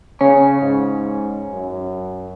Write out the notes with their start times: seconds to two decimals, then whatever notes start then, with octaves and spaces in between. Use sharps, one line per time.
0.21 C#3 C#4
0.61 G#2
1.51 F#2